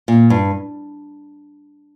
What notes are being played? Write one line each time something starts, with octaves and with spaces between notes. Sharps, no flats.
A#2
G2